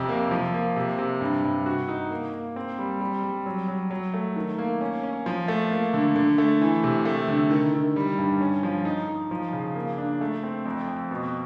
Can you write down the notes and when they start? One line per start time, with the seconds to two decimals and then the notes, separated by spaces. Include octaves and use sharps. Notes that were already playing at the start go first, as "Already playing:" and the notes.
Already playing: F2 C3
0.09 A#3
0.31 F3
0.53 A#3
0.76 C3
0.98 C3
1.21 G2
1.44 G2
1.66 F#4
1.88 D#4
2.10 A#3
2.34 A#3
2.56 C4
2.79 G3
3.01 G3
3.24 G3
3.46 F#3
3.68 F#3
3.91 F#3
4.14 A3
4.36 D#3
4.58 A#3
4.81 C#4
5.03 C#4
5.26 F3
5.48 A3
5.71 A#3
5.94 D3
6.16 D3
6.38 A3
6.61 E3
6.84 C3
7.05 A3
7.28 D3
7.50 D#3
7.73 D#3
7.96 G3
8.18 G2
8.41 C#4
8.63 F3
8.85 D#4
9.08 D#4
9.31 F3
9.53 C#3
9.75 A#3
9.98 D4
10.21 A3
10.43 C4
10.66 F2
10.88 F2
11.11 B2